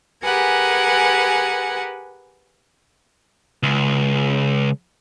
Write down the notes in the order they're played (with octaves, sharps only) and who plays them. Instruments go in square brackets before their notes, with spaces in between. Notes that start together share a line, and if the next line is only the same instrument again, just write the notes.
[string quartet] G4 G#4 A#4 B4 F#5 G#5
[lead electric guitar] C#2